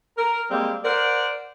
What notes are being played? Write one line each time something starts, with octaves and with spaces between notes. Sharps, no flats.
A#4
G3 G#3 A#3 C4
A#4 C5 D5 F#5